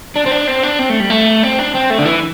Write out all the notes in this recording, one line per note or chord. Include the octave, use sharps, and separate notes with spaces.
D4
C4
D4
C4
D4
C4
A3
G3
A3
C4
D4
C4
A3
D3
E3